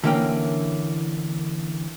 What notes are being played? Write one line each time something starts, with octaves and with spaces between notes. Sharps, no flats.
D3 E3 A#3 C#4 G5